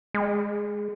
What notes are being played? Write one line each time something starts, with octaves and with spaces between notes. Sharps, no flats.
G#3